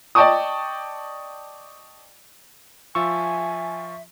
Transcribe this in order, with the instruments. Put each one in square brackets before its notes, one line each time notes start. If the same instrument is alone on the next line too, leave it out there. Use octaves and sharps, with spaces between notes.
[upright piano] D5 D#5 G5 A5 C#6 D#6
[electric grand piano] F3 F4 E6 [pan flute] E5 [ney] G#5 [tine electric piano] C#6